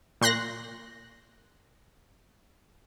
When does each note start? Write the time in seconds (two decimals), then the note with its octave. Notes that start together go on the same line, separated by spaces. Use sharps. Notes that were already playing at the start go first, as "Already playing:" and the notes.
0.21 A#2 C6 F#6 A#6